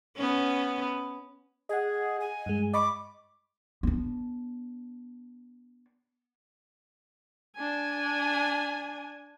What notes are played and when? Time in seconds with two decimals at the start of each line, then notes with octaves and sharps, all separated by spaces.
0.16 B3 C#4
1.69 G#4 D#5 F#5
2.21 G#5
2.46 G2 G#3
2.74 D#5 B5 C#6 D6
3.83 B3 D4
7.56 D4 G#5